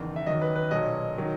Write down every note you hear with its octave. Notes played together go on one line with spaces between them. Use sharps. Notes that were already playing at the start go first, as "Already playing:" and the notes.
Already playing: F#1 E2 D#3
E5
D#2 D#3 F#3 D#5
B4
B4
B1 A#2 F#3 D#5
D#3 F#3